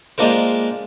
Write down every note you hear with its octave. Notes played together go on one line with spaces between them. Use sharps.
G#3 A#3 D4 F4 A#4 C5